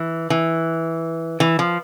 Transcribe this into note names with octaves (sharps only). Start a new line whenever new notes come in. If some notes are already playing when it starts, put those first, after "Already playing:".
Already playing: E3
E3
E3
F3